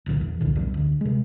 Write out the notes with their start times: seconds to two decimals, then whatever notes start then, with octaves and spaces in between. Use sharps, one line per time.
0.06 D1 G1 C2 A#2
0.21 E2
0.41 C2 A#2 D3
0.55 B1 E2 G2
0.74 D2
1.01 C3 G#3